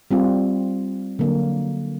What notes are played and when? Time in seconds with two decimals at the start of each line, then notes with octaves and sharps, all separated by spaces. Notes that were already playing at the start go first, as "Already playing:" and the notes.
0.11 G3 C4 F4
1.19 D3 F#3 A#3